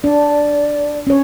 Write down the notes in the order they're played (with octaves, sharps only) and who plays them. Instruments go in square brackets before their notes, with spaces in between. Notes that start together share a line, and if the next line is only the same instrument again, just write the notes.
[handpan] D4 [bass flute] D5
[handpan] C#4 C#5